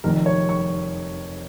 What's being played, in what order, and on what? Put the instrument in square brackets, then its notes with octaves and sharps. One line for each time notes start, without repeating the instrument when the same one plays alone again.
[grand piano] F1 F2 D#3 A#4
C#5
C#6